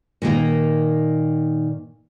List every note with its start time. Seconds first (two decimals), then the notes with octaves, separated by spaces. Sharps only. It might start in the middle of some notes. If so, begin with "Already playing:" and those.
0.22 A#2 D#3 A#3 A#4